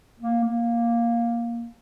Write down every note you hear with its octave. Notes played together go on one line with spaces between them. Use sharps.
A#3
A#3